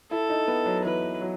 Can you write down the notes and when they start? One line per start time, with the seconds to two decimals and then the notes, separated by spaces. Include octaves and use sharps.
0.11 E4 A4
0.29 D#4
0.48 B3
0.66 F#3
0.85 E3 B4
1.21 F#3